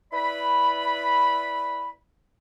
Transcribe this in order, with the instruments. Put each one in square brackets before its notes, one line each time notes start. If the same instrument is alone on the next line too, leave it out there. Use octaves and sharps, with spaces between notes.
[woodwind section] E4 B4 D5 B5